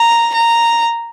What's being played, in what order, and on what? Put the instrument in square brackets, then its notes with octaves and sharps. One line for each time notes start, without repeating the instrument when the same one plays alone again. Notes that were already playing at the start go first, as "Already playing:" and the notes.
Already playing: [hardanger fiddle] A#5
A#5